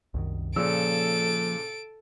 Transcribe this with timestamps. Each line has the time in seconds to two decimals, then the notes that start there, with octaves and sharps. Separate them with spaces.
0.14 C2 F#2 D#3
0.56 A#2 C#3 F3 A#3 A4 E6 D7